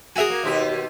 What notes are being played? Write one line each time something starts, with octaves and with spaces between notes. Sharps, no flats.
F#4 G#4 A#4 E5 G#5 D#6
A#3
D#2 B2 G4